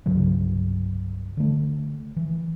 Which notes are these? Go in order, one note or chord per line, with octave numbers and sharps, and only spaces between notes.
C2 G2 C#3 F#3
D3 A3
E3